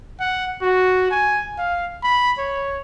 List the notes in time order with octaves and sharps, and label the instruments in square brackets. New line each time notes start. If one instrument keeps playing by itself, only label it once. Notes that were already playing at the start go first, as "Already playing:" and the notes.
[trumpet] F#5
F#4
G#5
F5
B5
C#5